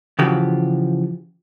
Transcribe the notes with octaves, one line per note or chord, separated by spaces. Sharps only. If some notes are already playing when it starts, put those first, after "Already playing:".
C#3 E3 F3 F#4 G4